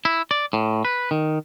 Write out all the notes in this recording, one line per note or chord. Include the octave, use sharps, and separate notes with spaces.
E4
D5
A2
B4
D#3